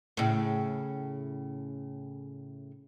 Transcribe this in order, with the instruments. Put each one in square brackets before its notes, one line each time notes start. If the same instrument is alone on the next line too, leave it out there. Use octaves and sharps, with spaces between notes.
[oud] A2 C#3